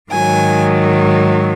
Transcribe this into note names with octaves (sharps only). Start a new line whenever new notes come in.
G#2 D#3 F#3 G#5